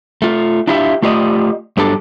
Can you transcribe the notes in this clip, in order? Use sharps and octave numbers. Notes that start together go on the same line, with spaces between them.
A3 F4
D4 E4 F4 G4 C#5 E5
A3 F4 G4 A#4 D5 D#5
G2 F#3 D4 G4 A4 A5